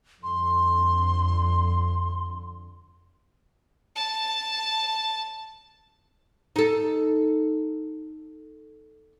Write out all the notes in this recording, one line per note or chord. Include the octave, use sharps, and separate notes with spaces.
F2 D3 C6
A5
D#4 A4